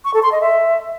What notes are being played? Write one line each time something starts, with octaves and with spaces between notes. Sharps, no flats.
C#6
A4
C6
D#5
E5